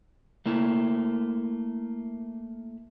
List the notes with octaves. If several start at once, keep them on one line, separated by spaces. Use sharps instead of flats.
A3 A#3 E4